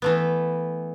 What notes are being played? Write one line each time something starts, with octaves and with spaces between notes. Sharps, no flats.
E3 A3 B3